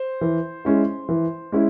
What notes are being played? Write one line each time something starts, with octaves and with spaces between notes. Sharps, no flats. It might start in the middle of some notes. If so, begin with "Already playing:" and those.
Already playing: C5
E3
G#3 C#4 E4
E3
G#3 C#4 E4